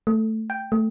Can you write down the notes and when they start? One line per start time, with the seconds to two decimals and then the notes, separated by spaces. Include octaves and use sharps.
0.07 A3
0.50 G5
0.72 A3